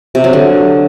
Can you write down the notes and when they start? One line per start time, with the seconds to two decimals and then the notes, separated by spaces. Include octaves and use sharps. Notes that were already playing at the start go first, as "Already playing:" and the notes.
0.15 C3
0.24 F#3
0.33 D3